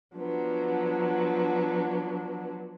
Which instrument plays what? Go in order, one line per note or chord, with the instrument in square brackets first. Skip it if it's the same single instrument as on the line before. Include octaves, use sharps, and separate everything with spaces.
[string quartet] F3 F#3 B3 D4